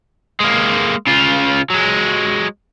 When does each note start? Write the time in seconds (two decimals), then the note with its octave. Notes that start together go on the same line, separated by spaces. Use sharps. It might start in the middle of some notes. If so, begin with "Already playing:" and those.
0.40 G#3 A#3
1.07 C#3 F4
1.70 F#3 G#3